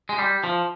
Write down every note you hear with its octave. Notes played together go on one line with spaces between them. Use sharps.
G#3
G3
F3